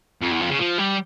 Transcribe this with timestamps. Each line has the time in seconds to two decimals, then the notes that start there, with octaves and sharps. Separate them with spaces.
0.22 F2
0.31 E2
0.40 F2
0.50 C#3
0.59 F3
0.78 G3